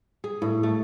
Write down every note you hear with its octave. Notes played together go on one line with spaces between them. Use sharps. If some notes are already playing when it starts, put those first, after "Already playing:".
G#4
A2
A3